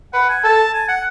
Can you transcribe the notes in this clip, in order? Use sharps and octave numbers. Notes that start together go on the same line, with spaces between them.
B4 F#5
G#5
A4 A5
G#5
F#5